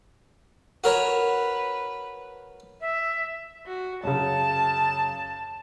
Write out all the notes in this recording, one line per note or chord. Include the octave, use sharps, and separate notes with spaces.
F#4 A#4 B4 C#5
E5
F#4
F#2 C#3 A5